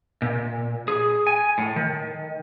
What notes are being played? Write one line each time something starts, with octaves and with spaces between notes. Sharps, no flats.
A#2
G#4
G#5
A2
D#3